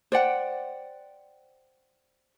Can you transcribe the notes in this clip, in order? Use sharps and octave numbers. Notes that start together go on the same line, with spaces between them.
C5 D5 F#5 G5